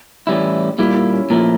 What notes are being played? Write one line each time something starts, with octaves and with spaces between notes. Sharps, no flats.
A2 E3 G3 C#4 E4
A#2 G3 A#3 E4
E4
C#4
A#2 F3 A3 A#3